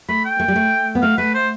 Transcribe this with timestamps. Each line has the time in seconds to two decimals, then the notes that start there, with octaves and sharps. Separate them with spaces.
0.09 A3 B5
0.25 G5
0.40 A3
0.48 G3
0.56 A3
0.95 B3
1.02 A3 F5
1.18 A3 B4
1.34 C5